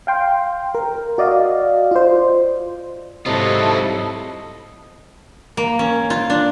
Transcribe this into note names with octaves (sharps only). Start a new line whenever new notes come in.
F5 G5 C6
A#4
F#4 D5 D#5 F5
F4 C5
G#2 C3 F#3 E4 F4 A4 D#5
A#3
C#4
F4
D4